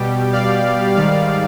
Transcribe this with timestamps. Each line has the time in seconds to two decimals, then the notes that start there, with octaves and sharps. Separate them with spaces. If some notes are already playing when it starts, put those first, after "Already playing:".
Already playing: B2 G3 G4
0.32 D5 F5
0.96 G#2 D#3 G3 D5 F5